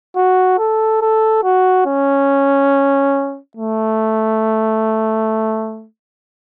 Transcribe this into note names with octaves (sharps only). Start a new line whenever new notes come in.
F#4
A4
A4
F#4
C#4
A3